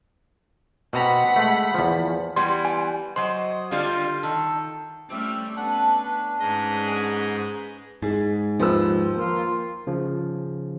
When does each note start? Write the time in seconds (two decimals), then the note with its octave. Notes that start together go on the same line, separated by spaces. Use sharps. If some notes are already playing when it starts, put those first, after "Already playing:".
0.93 B2 C4 F#5 A#5 B5
1.36 G#3 A3
1.74 E2 F3
2.36 E3 G3 B3 C6
2.65 G#5
3.16 F#3 C5 D#5 C6
3.71 D3 G3 F4
4.23 D#3 A4
5.10 G3 A3 C4 C#4 G4 E5 F6
5.56 B3 C#4 D4 A4 B4 F#5
6.40 G#2 C#4 G#4 B4 D#5
6.87 A#4 F#5 G#5
8.02 G#2 G#4
8.60 D#2 F3 B4 E6
9.16 A#3 F4
9.87 C#3 F3